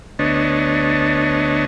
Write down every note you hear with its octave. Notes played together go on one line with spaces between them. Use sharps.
D2 B3 D4 C#5 D#5 A5